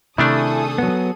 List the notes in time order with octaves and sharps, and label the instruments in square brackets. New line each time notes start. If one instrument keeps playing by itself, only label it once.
[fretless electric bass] C3 [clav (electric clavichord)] D#3 A3 D4 [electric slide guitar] E4 [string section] G#4 A4 D#6
[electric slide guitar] F#3 B3